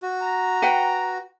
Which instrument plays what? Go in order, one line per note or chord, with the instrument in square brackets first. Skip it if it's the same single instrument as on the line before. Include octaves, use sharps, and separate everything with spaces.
[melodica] F#4
[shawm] A#5
[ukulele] B4 F#5 G5